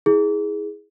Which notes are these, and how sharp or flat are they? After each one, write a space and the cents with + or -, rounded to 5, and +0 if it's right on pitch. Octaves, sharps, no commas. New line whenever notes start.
E4 -30 G#4 +0